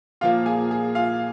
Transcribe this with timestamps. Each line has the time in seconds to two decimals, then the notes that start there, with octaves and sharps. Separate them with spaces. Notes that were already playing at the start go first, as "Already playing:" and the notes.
0.21 A#2 F3 A#3 F4 F5
0.46 G#4 G#5
0.71 G#4 G#5
0.95 F4 F5